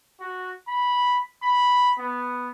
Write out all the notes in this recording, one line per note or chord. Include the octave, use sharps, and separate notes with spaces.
F#4
B5
B5
B3